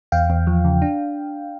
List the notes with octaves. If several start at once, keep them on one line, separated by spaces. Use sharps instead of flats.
E2 F5 G5
E2
F3
C#3
D4